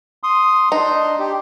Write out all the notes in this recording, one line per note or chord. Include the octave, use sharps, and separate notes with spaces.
C6 D#6
D4 D#4 C6
G4